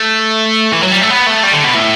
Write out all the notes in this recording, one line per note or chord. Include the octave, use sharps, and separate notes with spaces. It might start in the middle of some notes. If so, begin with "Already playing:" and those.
Already playing: A3
E3
F#3
G3
A3
B3
A3
G3
D3
B2
A2